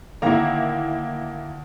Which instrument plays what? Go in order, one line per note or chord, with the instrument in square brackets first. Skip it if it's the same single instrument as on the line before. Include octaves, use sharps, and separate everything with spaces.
[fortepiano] D2 D#3 A#5 [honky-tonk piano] A#3 E4